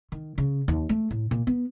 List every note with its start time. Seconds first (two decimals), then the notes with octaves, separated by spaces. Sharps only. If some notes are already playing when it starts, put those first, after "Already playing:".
0.12 D#3
0.38 C#3
0.68 D#2
0.89 A3
1.11 A2
1.31 A#2
1.47 B3